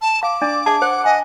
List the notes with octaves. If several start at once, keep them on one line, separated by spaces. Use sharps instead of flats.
A5
F5 D6
D4 D5
G#4 E5 A5
C5 F#5
D#5 G#5